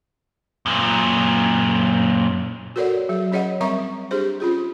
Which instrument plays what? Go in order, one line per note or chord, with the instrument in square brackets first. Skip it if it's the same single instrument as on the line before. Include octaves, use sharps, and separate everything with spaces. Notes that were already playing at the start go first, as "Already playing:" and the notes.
[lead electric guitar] F#2 A#2
[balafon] F#4 A4 A#4 C#5 D5 F#5
F#3 G#4
C#4 G#4 C#5 D#5 F#5
G3 C4 A#4 E5 A#5 C#6
D4 G4 G#4 C5
C#4 F4 G#4